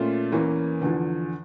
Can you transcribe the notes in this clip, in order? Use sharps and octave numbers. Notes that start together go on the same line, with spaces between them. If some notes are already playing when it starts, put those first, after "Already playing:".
Already playing: A#2 A3 C#4 F4
E2 E3 A#3 C#4
E2 D3 F3